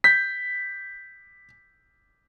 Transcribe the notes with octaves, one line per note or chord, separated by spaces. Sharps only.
G6 B6